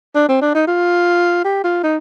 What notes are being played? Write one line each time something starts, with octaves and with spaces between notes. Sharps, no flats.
D4
C4
D4
D#4
F4
G4
F4
D#4